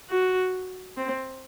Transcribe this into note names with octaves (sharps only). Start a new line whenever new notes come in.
F#4
C4